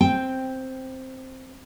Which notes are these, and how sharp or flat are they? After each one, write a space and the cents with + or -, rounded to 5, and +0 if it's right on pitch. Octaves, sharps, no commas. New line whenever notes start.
C4 +0 G5 +0